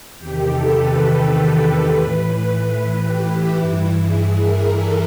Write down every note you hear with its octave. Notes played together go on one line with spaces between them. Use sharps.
E2 C3 D#3 G4
A4
B4
A2 E3
B4
G4
E4
G2 E3 E4
G#4
A#4
A4